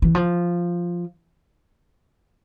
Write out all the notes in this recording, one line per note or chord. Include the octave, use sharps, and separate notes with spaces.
E3
F3